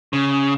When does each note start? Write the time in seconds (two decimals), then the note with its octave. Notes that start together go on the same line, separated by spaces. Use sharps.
0.13 C#3